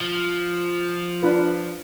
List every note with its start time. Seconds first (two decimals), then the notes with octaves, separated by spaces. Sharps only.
0.01 F3
1.23 D4 F4 B4